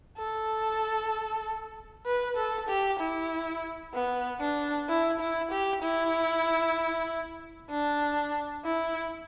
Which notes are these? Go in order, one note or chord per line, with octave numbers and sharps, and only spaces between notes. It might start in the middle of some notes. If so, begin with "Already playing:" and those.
A4
B4
A4
G4
E4
B3
D4
E4
E4
G4
E4
D4
E4